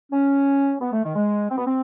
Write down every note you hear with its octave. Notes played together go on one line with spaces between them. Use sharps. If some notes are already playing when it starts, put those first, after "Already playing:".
C#4
B3
A3
D#3
G#3
C4
B3
C4